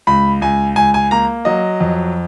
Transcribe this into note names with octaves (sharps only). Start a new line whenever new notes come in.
C#2 B5
C#2 G#5
C#2 G#5
G#5
A#3 A#5
F#3 D#5
F2